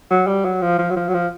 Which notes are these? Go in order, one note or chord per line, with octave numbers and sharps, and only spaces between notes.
F#3
G3
F#3
F3
F3
F#3
F3
F#3
F3